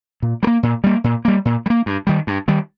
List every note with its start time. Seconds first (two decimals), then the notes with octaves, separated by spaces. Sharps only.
0.22 A#2
0.43 G3
0.47 A#3
0.63 A#2
0.84 G3 A#3
1.04 A#2
1.25 G3 A#3
1.45 A#2
1.66 G3
1.70 A#3
1.86 G2
2.07 D#3 G3
2.27 G2
2.48 D#3 G3